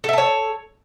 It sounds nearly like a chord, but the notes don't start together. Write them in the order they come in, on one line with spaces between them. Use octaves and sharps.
A4 E5 A5 C#5